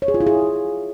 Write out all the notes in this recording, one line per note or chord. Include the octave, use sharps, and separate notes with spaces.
C#5
G#4
F4
E4
G#4